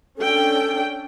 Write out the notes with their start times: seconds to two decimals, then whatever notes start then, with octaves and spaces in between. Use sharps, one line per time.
0.18 C#4 D4 A4 G5